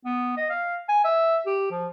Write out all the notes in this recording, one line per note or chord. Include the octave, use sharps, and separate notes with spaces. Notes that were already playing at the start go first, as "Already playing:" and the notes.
B3
D#5
F5
G#5
E5
G4
F3